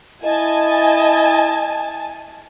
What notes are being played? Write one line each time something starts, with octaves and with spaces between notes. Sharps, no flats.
E4 D#5 G#5 A5